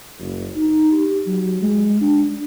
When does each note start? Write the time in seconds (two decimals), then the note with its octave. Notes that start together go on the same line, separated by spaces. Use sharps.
0.19 F#1
0.56 D#4
0.92 G4
1.26 F#3
1.62 G#3
2.02 D4